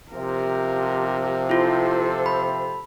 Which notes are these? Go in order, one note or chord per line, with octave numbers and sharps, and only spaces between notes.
C3 F3 G4 A#4
E4 F4 A4 C5
B5